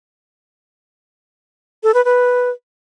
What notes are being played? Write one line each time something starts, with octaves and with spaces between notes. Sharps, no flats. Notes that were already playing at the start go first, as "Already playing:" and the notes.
A4
B4
B4